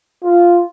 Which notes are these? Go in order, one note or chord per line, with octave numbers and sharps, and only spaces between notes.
F4